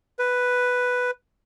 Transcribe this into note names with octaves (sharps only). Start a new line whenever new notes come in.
B4